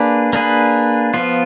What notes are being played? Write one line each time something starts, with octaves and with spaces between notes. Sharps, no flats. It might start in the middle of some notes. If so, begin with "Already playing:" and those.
Already playing: A#3 D4 G#4 B4
A#3 D4 G#4 B4
F3 B3 F4